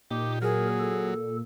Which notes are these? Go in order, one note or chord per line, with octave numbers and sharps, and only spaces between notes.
A#2 D#4 G4 D6
F#3 G#4 A#4
A4